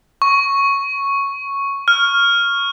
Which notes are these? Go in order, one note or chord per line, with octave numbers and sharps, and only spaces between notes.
C#6
F6